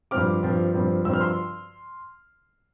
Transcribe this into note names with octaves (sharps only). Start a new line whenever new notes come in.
G2 F3 C4 D6 F6
G2 F3 C4
G2 F3 C4
G2 F3 C4 E6
F6
C6 E6